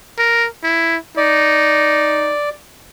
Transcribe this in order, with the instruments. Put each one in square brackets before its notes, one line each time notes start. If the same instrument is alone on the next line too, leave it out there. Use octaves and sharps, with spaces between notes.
[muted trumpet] A#4
E4
[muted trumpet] D#4 [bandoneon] D5